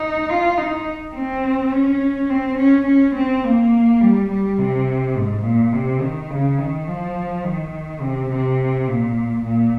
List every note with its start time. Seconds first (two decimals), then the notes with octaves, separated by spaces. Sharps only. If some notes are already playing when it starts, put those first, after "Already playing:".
Already playing: D#4
0.29 F4
0.58 D#4
1.15 C4
1.72 C#4
2.30 C4
2.58 C#4
2.87 C#4
3.15 C4
3.44 A#3
4.01 G3
4.30 G3
4.58 C3
5.16 G#2
5.45 A#2
5.73 C3
6.01 D#3
6.30 C#3
6.58 D#3
6.87 F3
7.44 D#3
8.01 C3
8.31 C3
8.87 A#2
9.45 A#2